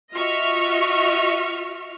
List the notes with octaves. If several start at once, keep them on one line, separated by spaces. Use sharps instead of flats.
F4 F#4 D#5 E5 C#6 F6